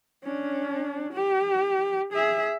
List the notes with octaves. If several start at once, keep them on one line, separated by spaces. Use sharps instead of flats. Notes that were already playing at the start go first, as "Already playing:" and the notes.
C#4 D4
G4
G#4 E5